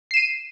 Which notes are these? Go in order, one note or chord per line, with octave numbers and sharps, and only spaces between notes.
C7 D#7 E7